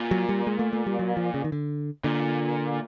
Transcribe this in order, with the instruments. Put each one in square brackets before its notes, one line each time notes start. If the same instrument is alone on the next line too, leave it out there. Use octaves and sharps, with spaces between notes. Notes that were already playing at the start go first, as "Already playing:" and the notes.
Already playing: [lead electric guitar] A#2
[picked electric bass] F#3
G3
G#3
A3
A3
G3
F#3
F3
C#3
D#3
D3
[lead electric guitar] A#2 [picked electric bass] D3